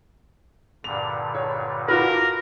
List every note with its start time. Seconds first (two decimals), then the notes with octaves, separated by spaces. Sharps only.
0.84 G2 A#2 D3 F7
1.35 C#5
1.88 F4 F#4 A#4 B4